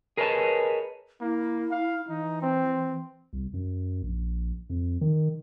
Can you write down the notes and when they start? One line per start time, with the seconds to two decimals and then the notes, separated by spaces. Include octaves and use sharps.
0.17 G#4 A#4 B4 C#5 D#5 A5
1.21 A#3 E4
1.71 F5
2.09 E3 D#4
2.42 C4
3.33 C2
3.54 F#2
4.03 A#1
4.70 F2
5.01 D#3